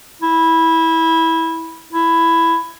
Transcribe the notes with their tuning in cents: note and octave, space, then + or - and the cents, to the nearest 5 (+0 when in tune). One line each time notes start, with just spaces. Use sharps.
E4 -15
E4 +10